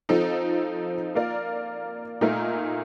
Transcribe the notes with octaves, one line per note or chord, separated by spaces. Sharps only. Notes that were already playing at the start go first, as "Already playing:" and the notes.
F3 C4 D#4 A4
A#3 F4 A#4 D5
A#2 A3 D#4 A#4